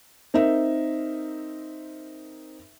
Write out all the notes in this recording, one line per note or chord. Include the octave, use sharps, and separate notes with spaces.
C4 D#4 A#4 E5